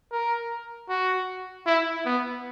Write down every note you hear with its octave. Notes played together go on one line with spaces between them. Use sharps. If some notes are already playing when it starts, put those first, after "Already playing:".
A#4
F#4
E4
B3